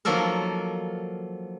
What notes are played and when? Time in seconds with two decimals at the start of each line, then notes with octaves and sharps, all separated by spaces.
0.05 D#3 F3 F#3 A#3 A4 A#4